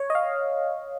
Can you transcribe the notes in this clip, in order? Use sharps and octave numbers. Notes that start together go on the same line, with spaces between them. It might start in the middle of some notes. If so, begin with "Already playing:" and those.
Already playing: C#5
D#5
F5